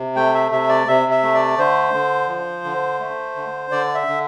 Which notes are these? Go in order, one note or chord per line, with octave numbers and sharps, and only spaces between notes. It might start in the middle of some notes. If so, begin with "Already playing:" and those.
Already playing: C3
A3 G5
E5
C3 E5
D5
C3 E5
E5
A3
D5
D3 C5
D3
F3
D3
A3
D3
D3 D5
E5
D3